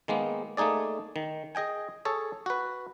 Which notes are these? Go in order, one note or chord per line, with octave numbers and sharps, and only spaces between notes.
D#3 G#3 A#3 B3
A3 A#3 D#4 G#4 D5
D#3
G#4 D#5 G5 G#5
G#4 A4 C#5
F#4 B4